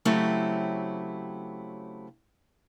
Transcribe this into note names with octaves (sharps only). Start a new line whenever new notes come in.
C#3 F#3 A3 C4 E4 G4